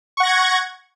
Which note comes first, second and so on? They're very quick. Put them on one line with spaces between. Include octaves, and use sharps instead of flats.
C#6 F#5 A#6 G#6